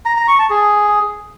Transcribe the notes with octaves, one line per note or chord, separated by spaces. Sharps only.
A#5
A#5
C#6
A5
G#4